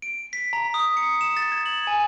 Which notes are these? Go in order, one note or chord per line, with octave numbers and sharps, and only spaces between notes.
D7
B6
A#5
D#6
C#7
E7
A6
G#6
F#7
G#5